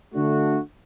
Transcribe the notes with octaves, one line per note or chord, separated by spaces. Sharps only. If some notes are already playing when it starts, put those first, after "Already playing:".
D3 A3 D4 F#4